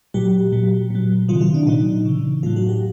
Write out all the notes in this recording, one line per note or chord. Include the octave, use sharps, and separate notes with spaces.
A#2 F#3 G4
A#2 F#3
A#2 F#3
C3 D#3 F#3 F4
E4
D4
A#2 F#3 D#4
C#3 E3
A2 F#3 F4
F#4
G4